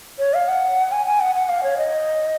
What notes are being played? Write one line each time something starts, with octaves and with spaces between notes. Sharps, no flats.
C#5
F5
F#5
G#5
G#5
F#5
F#5
F5
C#5
D#5